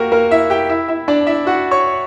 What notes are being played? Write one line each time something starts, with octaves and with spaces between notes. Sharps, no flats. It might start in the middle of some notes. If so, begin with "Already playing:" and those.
Already playing: A#3 F#4 G4 A#4
A#3 A#4
E4 E5
G4 G5
E4 E5
E4 E5
D4 D5
E4 E5
F#4 F#5
C#5 C#6